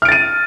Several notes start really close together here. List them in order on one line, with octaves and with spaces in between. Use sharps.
F6 D7 A6 D#7